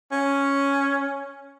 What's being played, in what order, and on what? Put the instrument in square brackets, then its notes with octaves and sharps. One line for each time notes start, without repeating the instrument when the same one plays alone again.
[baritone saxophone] C#4